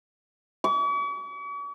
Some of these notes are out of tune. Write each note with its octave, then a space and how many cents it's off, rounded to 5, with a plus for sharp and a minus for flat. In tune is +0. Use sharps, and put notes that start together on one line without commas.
C#6 +45